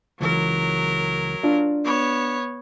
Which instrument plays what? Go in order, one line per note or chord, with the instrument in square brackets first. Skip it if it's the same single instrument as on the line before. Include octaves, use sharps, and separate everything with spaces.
[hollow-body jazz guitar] C#2 E3 [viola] F#3 A#4
[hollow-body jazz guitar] D4 F4
[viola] B3 C#5